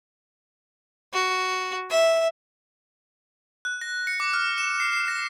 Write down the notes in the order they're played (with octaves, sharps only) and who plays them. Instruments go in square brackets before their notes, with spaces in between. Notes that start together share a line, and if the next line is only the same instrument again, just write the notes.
[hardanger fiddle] F#4
E5
[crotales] F#6
A#6
C#7
D6
F6
E7
C7
C7
A#6